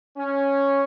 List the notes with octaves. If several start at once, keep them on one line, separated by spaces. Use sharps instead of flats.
C#4